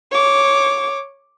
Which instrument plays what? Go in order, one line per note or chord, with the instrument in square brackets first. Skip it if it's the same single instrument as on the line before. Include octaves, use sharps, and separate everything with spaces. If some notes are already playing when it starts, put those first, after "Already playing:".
[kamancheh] C#5 D6